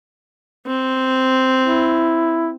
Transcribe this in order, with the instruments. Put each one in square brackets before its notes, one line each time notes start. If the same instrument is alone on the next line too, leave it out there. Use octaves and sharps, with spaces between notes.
[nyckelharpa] C4
[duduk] E4